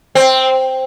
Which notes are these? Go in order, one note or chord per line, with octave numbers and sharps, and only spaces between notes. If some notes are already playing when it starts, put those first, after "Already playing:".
C4